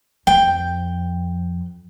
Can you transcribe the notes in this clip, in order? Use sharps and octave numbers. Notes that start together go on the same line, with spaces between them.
F2 G5